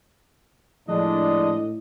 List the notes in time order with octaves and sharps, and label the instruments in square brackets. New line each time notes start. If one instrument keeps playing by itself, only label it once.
[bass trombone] A2 [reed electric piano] F3 [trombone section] G#3 D4 [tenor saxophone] D#5